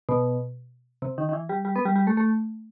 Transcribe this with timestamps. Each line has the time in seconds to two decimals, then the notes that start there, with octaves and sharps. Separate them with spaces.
0.09 B2
1.02 C3
1.18 D#3
1.29 D#3
1.33 E3
1.49 G3
1.65 G3
1.76 B3
1.85 G3
1.96 G3
2.07 A3
2.17 A3